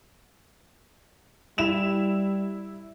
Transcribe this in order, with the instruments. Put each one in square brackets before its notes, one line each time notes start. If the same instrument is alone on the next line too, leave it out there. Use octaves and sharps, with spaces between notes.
[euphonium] G3 [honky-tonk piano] E4 E7 F7